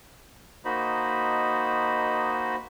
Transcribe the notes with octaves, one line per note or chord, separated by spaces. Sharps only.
A#3 D#4 F#4 C5 D#5 B5